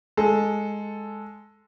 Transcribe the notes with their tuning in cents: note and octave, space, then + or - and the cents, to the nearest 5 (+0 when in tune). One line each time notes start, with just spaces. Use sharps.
G#3 +0 A4 +0